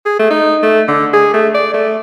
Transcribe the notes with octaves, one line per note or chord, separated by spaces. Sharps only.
G#4
A3
D#4
A3
D3
G#4
A3
D5
A3